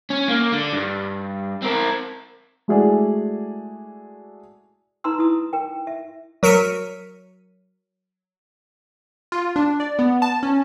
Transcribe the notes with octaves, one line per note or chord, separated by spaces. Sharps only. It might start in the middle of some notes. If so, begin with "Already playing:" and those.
C#4
A#3
D3
G2
C4 A#4
G#3 A3 E4 F#4 G#4 D5
D#4 B4 A#5 C6 E6
E4 D#6
A#4 G5
E5
F#3 A#4 B6 C#7 D#7
F4
D4
D5
B3
A5
C#4